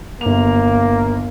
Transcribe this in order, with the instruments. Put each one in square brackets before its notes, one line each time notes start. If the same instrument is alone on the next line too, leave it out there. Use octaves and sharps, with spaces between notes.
[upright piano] G1 F7 [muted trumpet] A#3